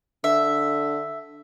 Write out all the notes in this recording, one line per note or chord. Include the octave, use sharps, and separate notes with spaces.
D3 E5